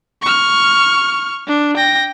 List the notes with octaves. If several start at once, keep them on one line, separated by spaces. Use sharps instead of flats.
C#6 F6
D4
G5 A#6